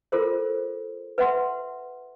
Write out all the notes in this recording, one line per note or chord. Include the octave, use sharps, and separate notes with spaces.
F4 A4 A#4 C5
B4 E5 F#5 C6